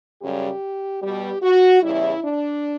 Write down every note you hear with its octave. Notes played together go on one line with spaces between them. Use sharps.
F#2 C#3 G3 G4
B2 G3 G4
F#4
E2 C#3 G3 E4
D4